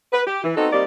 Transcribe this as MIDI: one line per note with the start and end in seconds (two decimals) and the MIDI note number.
0.13 0.22 71
0.27 0.41 67
0.44 0.52 52
0.57 0.68 59
0.57 0.68 60
0.57 0.68 63
0.57 0.68 66
0.57 0.68 69
0.72 0.84 55
0.72 0.84 58
0.72 0.84 60
0.72 0.84 63
0.72 0.84 67
0.72 0.84 74